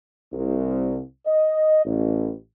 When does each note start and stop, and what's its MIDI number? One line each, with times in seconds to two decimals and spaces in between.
0.32 0.98 36
1.26 1.83 75
1.85 2.31 33